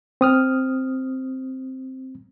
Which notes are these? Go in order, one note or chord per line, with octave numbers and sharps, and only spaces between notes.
C4 D#6 F6